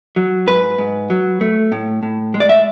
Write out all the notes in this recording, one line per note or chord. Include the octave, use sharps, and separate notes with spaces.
F#3
G#2 B4
G#2
F#3
A3
A2
A2
G#3
D5
E5